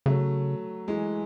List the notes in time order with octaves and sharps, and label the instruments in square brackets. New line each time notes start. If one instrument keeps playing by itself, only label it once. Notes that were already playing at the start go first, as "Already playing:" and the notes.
[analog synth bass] C#3 [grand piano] F#3 A3
[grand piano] E3 G#3